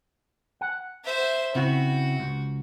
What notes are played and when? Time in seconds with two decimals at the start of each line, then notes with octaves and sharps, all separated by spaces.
0.61 F#5
1.04 C5 E5
1.55 C#3 C4 E4 F#4
2.20 C#2